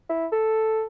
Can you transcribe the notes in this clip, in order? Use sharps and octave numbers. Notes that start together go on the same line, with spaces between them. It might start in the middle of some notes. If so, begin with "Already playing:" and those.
E4
A4